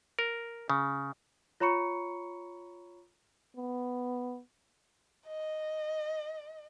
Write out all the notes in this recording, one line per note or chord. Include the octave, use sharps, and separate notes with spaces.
A#4
C#3
F4 C#5 A#5 B5 C#6 C#7
B3
D#5